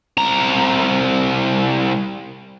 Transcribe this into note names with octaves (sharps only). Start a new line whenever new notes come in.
C2 A#5